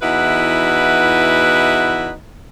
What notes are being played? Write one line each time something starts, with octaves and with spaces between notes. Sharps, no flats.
E2 D#4 E4 F#4 B4